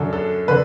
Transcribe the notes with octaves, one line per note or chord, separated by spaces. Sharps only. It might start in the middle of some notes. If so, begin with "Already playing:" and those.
Already playing: F#2 D3 A4
A4
D3 B4